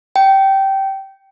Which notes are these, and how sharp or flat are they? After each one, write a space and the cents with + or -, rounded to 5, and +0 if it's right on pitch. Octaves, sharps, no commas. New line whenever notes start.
G5 -15